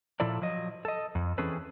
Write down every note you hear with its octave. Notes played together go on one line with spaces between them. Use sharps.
A#2 F3 E4 A4 D5
F3 F#3 D#5
A4 D#5
F2
E3 C4 C#4 G#4 A4 B4